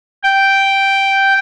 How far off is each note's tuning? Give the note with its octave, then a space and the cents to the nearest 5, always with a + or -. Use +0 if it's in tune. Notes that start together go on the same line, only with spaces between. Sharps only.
G5 -5